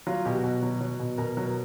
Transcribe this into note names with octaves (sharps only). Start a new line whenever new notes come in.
F#3 F4
B2 G4
F#4
B2
F#3
F#3
B2
B2 A#4
F#3
A#4